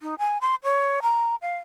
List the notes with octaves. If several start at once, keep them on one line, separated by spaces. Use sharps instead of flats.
D#4
G#5
C6
C#5
A#5
F5